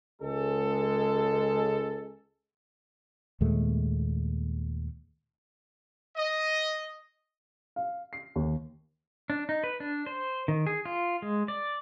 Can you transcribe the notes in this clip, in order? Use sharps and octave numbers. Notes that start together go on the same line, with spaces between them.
C#2 G#3 A4
D#2 A#2 G#3 A3
D#5
F5
C7
D#2
D4
D#4
B4
D4
C5
D#3
G#4
F4
G#3
D5